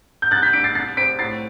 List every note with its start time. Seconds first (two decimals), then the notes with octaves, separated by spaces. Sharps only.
0.22 G6
0.31 C2 F#6 A6
0.42 G6 B6
0.53 D4 B6 D7
0.64 A6 C7
0.75 C2 A6 C7
0.97 C4 B6 D7
1.19 A2 A6 C7